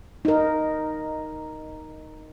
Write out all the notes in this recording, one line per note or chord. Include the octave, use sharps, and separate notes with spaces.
D#4 A#4